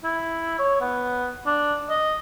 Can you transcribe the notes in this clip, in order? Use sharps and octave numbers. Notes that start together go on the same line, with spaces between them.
E4
C#5
B3
D4
D#5